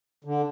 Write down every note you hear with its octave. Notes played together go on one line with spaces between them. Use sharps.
D3